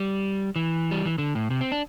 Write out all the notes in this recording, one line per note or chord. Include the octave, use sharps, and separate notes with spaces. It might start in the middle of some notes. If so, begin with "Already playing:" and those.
Already playing: G3
E3
G3
E3
D3
A2
C3
C4
D4